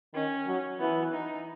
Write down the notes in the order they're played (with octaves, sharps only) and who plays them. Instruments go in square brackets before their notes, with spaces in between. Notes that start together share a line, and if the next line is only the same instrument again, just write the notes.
[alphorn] D#3 [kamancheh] C#4
[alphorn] F#3
[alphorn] E3 [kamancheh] B3
[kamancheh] D#4